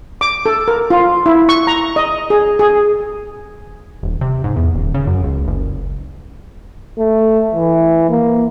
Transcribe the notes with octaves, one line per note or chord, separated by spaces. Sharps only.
D6
A4
A#4
F4
E4
C#6
A#5
D#5
G#4
G#4
D#1
C3
G#2
E2
D#1
C#3
F#2
C#2
F#1
A3
E3
A#3